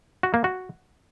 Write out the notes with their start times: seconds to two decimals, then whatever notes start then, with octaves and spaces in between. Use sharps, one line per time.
0.23 F#4
0.34 A#3
0.44 F#4